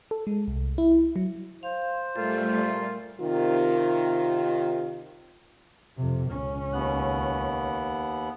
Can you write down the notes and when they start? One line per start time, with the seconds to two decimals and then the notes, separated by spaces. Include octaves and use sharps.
0.11 A4
0.27 G#3
0.48 C2
0.78 E4
1.16 F#3
1.63 C5 F5
2.16 A#2 G3 A3 F4 A4
3.21 C3 D#3 F4
5.97 F2 C3
6.31 C#2 C#4
6.73 D#2 B3 F#6